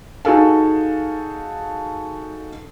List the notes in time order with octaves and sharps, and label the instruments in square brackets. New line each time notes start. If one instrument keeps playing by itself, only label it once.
[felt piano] D#4 F#4 G#4 A4 F5 A5